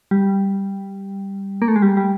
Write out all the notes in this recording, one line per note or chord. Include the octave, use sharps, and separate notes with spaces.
G3
A#3
A3
G#3
G3
G3